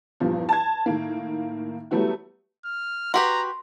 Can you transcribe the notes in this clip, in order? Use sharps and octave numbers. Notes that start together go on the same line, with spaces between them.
E2 G2 A#2 F3
A5 G#6
A2 D#3 A#3
F#3 G3 A3 B3 E4 F#4
F6
F#4 G4 B4 A#5 C6